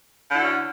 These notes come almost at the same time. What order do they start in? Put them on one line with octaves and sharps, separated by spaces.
D3 E4 F#4 C#4